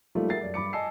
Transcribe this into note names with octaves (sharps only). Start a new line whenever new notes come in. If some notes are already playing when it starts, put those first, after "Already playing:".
F3 G3 A3 A#3 D#4 F4
F#4 G#4 A#4 E5 A6 C7
F#2 D5
G2 B5 D6 C#7
D#5 G#5 A5 E6 C7